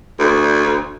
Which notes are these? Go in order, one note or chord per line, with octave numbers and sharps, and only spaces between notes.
D2